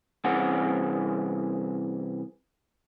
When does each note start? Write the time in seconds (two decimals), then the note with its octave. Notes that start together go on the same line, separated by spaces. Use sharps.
0.24 C2 E3 C4 C#4 G#4 F#5